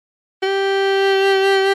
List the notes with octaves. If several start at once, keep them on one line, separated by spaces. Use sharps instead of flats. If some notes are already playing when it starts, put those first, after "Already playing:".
G4